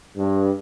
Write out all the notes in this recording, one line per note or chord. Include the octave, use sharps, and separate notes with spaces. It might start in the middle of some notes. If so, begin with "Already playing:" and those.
G2